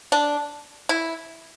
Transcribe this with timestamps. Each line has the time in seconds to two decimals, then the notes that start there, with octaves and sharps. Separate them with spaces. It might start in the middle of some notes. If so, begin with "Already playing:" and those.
0.12 D4
0.89 E4